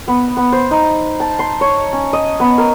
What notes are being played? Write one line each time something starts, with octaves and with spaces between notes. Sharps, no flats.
B3
B3
C5
D#4
A5
C6
C#5
C#4
D#5
B3
A#4